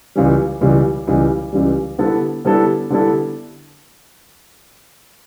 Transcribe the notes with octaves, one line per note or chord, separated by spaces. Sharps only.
C#2 C#3 E3 G3
C#2 C#3 E3 G3
C#2 C#3 E3 G3
C#2 C#3 E3 G3
D3 G3 B3 E4 A4
D3 G3 B3 E4 A4
D3 G3 B3 E4 A4